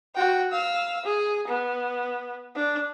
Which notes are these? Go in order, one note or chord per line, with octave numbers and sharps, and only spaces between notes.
F#4 G5
F5 E6
G#4
B3
D4